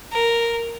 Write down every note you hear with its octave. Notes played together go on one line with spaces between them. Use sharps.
A#4